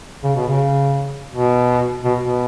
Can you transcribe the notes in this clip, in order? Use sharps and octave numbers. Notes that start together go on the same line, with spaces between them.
C#3
B2
C#3
B2
B2
B2